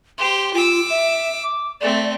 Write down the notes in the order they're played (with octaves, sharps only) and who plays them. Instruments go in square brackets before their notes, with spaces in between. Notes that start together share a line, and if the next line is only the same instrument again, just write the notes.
[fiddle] G4 C5 [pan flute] C6
[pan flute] F4 [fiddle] D6 E6
[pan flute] E5
D6
[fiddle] A3 C4 [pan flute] D5